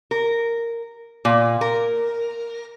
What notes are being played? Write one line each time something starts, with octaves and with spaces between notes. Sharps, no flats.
A#4
A#2
A#4